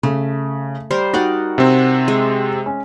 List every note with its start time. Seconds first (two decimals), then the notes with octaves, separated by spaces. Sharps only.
0.03 C#3 A3
0.91 G3 A#4 C5
1.14 D#4 F#4 A#4 D5 F#5 G5
1.58 C3 C4
2.08 G#3
2.66 C#4